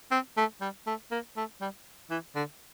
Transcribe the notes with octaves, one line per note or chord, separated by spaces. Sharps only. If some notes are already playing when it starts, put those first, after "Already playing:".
C4
A3
G3
A3
A#3
A3
G3
E3
D3